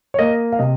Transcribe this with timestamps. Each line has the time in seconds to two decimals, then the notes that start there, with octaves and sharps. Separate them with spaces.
0.14 C#5
0.18 A#3 D#5
0.52 F5
0.59 C3 D#5